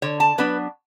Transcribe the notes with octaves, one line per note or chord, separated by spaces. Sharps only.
D3 C#5
A5
F#3 B3 D4 B4